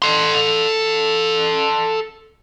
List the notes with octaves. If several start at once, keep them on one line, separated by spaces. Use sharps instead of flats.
A4 C6